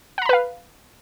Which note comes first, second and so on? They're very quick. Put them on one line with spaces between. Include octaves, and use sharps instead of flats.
F#5 A#5 B5 B4 F5